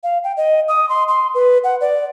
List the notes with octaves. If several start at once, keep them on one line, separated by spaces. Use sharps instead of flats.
F5
G5
D#5
D#6
C6
C6
B4
F#5
D5